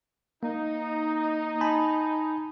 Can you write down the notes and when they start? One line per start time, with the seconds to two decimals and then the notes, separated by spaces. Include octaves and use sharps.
0.43 A#3 D#4
1.61 G#5 A5 B5